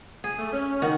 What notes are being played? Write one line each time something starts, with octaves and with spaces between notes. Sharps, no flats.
G#4
A3
C#4
D#3 F#4